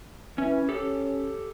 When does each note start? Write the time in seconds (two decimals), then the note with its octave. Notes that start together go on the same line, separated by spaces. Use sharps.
0.38 E3 C#4
0.69 C#4 G4 A4